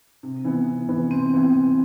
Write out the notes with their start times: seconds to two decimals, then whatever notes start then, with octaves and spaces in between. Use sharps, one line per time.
0.23 C3
0.45 E3 B3
0.67 C3
0.89 E3 B3
1.11 C3 C4
1.34 E3 B3
1.56 C3